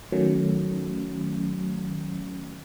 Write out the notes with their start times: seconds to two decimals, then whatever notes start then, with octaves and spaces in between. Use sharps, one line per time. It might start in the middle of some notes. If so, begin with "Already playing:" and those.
0.12 D#3 F#3 A3 C#4